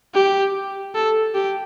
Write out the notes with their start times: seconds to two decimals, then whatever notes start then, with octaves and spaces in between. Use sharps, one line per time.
0.14 G4
0.95 A4
1.34 G4